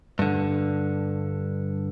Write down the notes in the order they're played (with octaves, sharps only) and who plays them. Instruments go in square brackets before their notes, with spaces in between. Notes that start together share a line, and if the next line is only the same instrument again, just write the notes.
[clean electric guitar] G2 D3